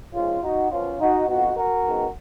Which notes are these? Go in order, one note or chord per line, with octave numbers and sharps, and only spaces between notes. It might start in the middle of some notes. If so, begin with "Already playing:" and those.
D#2 C#3 F3 G#3 C#4 F4
D#4 F#4
F#2 F3 B3 C#4 F4
D#4 F#4
F2 F3 B3 D#4 F#4
F#4 A#4
F#2 D#3 G#3 B3